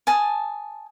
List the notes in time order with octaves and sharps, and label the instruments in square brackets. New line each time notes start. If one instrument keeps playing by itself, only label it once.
[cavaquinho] G#5 A5 D#6